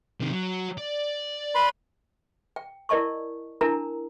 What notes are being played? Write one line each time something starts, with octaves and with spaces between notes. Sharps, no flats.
C3 D#3
F#3
D5
B4 B5 C6
G5
E4 A#4 D5 D#5 A5 C#6
D4 E4 A#4 A5 A#5